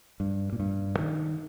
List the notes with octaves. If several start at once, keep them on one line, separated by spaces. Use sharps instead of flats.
G2
A#2
G2
D#3